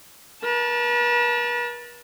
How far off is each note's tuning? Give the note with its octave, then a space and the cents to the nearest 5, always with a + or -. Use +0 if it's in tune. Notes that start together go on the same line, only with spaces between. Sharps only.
B4 -45 A5 +0